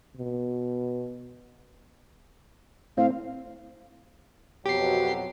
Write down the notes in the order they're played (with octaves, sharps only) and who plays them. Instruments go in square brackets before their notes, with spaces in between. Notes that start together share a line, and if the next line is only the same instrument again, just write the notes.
[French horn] B2
[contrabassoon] A2 [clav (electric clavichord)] C4 [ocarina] F5
[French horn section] F2 B2 F#3 [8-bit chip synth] G4 C7